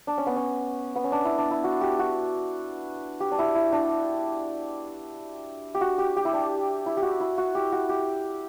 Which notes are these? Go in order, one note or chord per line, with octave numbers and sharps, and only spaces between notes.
D4
C#4
B3
C#4
B3
C#4
D4
E4
D4
E4
F#4
G4
F#4
G4
D4
E4
E4
D4
G4
F#4
G4
G4
E4
D4
E4
G4
F#4
E4
F#4
G4
F#4
G4